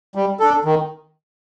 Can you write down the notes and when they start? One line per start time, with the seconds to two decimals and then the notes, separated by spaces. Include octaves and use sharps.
0.15 G3
0.40 D4 A4
0.65 D#3